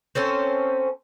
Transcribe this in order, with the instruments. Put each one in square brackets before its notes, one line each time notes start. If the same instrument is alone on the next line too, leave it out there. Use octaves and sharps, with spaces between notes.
[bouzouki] C4 C#4 A4 C5